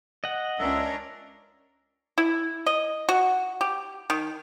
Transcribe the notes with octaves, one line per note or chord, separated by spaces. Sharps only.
D#5 F#5
C#2 C#4 D4 A#4 E5
E4
D#5
F#4
G4
D#3